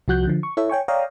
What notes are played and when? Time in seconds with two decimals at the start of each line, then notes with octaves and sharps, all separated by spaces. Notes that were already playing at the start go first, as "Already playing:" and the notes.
0.08 C2 F3 F#4 F#6 G6
0.27 D3 F3
0.43 C#6
0.57 E4 A4 C#5 E5
0.70 C#5 G5 G#5 C#6
0.88 C#5 D5 F5 G5 A#5 D#6